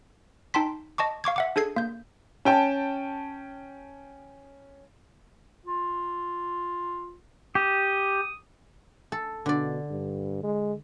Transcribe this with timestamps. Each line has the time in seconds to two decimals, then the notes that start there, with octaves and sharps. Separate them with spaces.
0.54 D#4 G5 A5 C6 B6
0.98 D#5 A5 C#6 D6
1.24 F5 C#6 D6 G#6
1.36 E5 F#5 D6
1.56 D4 G#4 A4 G#6 C7
1.76 A#3 G6
2.45 C#4 G5 A5
5.66 F4
7.55 G4 D#6
9.12 A4
9.46 B2 D3 D5
9.91 G2
10.43 G#3